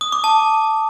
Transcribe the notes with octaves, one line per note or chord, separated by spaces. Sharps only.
D#6
D6
A5